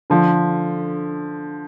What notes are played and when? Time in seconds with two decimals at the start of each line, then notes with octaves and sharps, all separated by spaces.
0.10 D3 F3